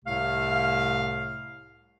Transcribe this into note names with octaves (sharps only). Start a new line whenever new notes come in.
C2 A2 C3 A3 F5